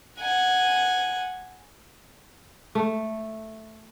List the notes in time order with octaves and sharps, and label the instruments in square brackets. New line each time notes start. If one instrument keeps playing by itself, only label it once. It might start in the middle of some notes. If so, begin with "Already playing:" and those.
[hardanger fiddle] F#5 G#5
[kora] A3